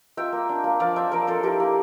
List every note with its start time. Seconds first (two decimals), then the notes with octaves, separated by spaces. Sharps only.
0.17 F4 E5 G5
0.32 A#3
0.49 D4
0.64 A#3
0.80 F3 D5 F5
0.96 D4 C5 E5
1.12 F3 A#4 D5
1.27 F4 A4 C5
1.43 E4 G4 A#4
1.60 A#3